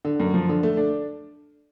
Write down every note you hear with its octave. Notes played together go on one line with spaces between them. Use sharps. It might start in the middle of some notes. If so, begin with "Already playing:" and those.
D3
F#2
F3
D3
A3
D4